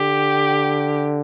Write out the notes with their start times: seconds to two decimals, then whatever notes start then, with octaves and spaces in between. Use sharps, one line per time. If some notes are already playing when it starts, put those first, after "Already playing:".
Already playing: D3 G4